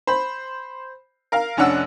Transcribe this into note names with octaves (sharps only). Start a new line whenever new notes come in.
C5 B5
A#4 F5
F1 C#4 D4 F#5 E6